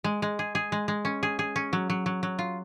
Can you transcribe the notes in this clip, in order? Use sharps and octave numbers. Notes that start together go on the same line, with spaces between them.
G#3
G#3
G#4
G#4
G#3
G#3
C#4
G#4
G#4
C#4
F#3
F#3
F#3
F#3
F4